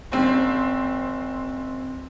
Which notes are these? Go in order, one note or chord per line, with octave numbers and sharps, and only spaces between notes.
F#1 C4